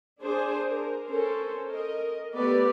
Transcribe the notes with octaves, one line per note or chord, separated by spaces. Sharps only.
D4 G#4 C5
A#4
C#4 A4 A#4 C5
A#4 D#5
A3 B3 G4 A4 B4 D5